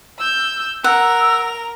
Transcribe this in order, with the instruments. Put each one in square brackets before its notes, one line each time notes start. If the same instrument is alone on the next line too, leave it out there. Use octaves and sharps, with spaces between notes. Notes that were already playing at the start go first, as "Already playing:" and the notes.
[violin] E6 G6
[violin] A#4 F7 [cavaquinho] F#5 [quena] E6